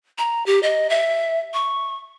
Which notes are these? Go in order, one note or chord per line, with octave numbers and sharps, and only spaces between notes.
A#5
G4
D#5
E5
C#6